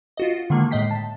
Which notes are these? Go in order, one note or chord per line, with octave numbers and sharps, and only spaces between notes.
F4 F#4 D#5
G#2 D3 D#3 G#3 A#3
A2 G#3 D#5 G5 B6 C7
A5